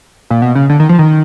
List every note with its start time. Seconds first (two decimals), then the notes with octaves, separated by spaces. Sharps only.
0.30 A#2
0.42 B2
0.55 C#3
0.69 D3
0.80 D#3
0.89 F3
0.99 D#3